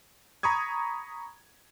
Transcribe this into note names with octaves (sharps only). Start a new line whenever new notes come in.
A#5 B5 C#6 D#6 G#6